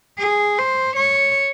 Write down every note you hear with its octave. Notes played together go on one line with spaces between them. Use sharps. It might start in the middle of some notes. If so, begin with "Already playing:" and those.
G#4
C5
C#5